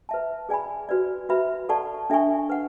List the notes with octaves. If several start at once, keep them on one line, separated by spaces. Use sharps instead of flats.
B4 E5 A5
G#4 D5 G#5 B5
F#4 B4 D5
F#4 B4 E5 B5
A4 D5 F#5 A5 C#6
D4 A4 E5 G#5 C#6
B4 F#5